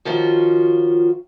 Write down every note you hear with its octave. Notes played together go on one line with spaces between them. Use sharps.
D#3 F3 C#4 F4 F#4